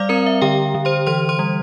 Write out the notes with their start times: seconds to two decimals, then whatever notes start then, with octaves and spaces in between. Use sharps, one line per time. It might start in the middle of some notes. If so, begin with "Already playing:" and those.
Already playing: G3 D5 F5 D6 F6
0.09 C4 A#4 A#5
0.26 E5
0.42 D3 G4 G5
0.74 D3
0.85 C5 C6
1.07 E3 C5 C6
1.29 C5 C6
1.39 G3